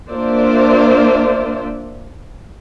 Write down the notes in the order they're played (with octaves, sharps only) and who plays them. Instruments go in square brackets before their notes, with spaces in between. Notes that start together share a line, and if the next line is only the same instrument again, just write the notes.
[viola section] A#3 D4 F4 C5 D5 E5